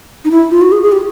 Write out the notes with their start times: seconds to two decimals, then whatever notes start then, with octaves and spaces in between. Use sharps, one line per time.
0.25 D#4
0.31 E4
0.51 F4
0.61 F#4
0.72 G#4
0.82 G#4
0.92 G4